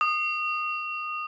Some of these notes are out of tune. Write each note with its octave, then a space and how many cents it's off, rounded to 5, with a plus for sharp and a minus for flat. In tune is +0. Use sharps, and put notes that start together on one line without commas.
D#6 -20